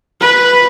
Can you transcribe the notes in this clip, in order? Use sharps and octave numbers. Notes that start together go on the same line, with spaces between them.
B4